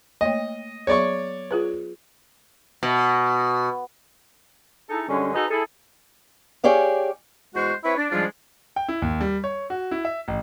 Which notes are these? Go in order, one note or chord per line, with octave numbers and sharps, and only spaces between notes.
A3 A#3 C#5 D#5
F#3 B3 G#4 C#5 D5 C#6
F4 G#4 B4
B2
D#4 E4 G#4 A4
F#2 D3 G3 G#3 C#4
D#4 F#4 G#4 A4 B4 D#5
E4 G#4 A4
G4 G#4 C#5 D5 F5
E2 G#3 F#4 C5 F#5 C#6
C4 E4 B4 C#5 E5
D4
G#2 F3 G3 G#3 D4 F4
G5
E4
D#2
G3
C#5
F#4
E4
E5
A1